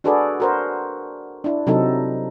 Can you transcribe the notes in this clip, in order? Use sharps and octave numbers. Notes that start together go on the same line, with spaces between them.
D4 F#4 G#4 A4 B4 D5
F#4 A#4 C5
D4 E4
C3 F#3 C4 D#4 A4